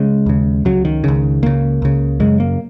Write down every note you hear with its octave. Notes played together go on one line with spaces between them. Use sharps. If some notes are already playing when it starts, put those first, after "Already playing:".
Already playing: C#3 G#3
D#2 C#3
C#2 C#3 F#3
D#3
C#2 C#3
C#2 C#3 A#3
C#2 C#3
F#2 C#3 G#3
A#3